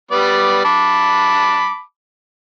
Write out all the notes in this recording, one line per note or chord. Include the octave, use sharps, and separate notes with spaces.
G3 B3 D5
A5 B5 D6